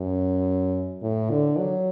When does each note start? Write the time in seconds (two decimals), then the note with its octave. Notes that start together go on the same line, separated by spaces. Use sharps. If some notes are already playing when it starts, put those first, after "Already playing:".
Already playing: F#2
1.02 A2
1.30 D3
1.58 F#3